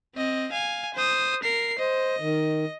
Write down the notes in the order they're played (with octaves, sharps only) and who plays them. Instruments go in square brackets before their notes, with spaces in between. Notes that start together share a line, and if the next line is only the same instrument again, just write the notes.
[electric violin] C4 D#5
F5 G#5
C5 D#6
A#4 C7
[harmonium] C5 [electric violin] D#5
[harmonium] D#3